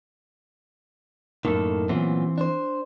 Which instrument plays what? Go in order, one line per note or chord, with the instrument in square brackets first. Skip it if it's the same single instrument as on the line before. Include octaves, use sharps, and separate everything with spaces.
[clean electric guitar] F#2 D#3 [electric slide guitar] A2 A#3 A4
[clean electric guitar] A#2 F#3 B3 [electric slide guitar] E3 C4
[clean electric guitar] D4 C5